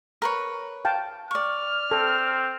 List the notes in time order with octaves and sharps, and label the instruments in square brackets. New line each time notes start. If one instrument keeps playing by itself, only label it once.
[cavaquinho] A#4 B4 C#5
[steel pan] F5 G5 A5
[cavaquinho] D5 C#6 [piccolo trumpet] F6
[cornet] C4 [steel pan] A4